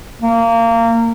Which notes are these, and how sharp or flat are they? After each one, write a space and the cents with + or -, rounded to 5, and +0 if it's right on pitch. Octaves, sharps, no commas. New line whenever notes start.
A#3 -25